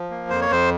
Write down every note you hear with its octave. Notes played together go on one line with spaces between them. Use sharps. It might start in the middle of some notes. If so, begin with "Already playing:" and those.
Already playing: F3
A#3
F2 C5
C#5
F2 C5